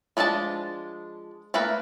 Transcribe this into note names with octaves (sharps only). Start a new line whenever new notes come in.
F3 G#3 D4 F#4 A5
A3 A#3 E4 A#4 B4